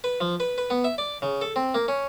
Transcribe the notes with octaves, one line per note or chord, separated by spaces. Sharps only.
B4
F3
B4
B4
B3
E5
D5
C#3
A4
C4
A#3
C#4